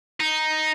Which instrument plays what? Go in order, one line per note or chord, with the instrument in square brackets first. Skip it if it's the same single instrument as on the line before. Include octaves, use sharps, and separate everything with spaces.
[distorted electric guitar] D#4